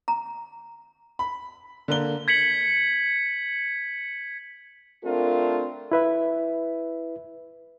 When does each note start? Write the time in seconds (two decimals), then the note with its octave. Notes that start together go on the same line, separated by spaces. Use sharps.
0.08 A#5
1.19 B5
1.88 D3 A#3 G7
2.28 G#6 B6 C#7 F#7
5.05 A3 C4 D4 F4 A#4
5.92 E4 B4 E5